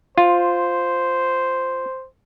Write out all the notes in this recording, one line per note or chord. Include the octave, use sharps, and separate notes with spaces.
F4 C5